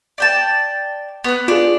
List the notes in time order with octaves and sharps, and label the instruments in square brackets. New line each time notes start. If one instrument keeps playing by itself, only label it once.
[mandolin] D5 G5 A5
B3 F#6
[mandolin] D4 [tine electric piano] F4 G#4